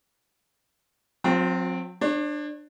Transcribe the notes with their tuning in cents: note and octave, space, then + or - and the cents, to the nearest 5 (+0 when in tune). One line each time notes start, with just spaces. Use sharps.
F#3 -40 C4 +0 F4 +40
D4 +20 C#5 -35